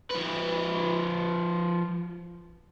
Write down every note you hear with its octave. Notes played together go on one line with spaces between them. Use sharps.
F3 B4